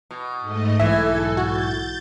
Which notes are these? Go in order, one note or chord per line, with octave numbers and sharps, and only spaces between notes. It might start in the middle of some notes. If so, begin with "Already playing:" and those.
B2
G#2 A3 D#5
B1 G#2 E3 A4 E5 G#6
F#4 G6 A6